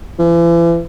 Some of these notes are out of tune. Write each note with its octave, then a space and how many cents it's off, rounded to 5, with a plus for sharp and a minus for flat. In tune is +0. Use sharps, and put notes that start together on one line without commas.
E3 +40